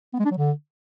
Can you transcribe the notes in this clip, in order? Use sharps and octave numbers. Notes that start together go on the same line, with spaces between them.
B3
G#3
D4
F#3
D3